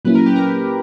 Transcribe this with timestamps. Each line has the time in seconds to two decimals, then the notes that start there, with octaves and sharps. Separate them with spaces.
0.05 A#2 F#3 A#3 C#4 E4 B4
0.15 A#4
0.26 G4
0.36 A#4